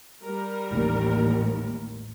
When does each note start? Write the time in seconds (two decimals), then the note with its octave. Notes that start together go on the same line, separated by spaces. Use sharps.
0.25 G3 A#4
0.71 A1 D#2